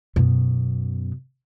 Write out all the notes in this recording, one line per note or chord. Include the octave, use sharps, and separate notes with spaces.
F#2 B2